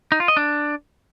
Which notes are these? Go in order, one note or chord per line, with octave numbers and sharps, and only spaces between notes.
D#4
F4
D#5
D4